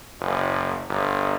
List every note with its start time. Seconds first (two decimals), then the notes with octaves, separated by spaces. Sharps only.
0.21 F#1
0.89 G1